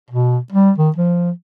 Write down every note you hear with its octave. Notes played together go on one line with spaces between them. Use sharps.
B2
G3
D#3
F3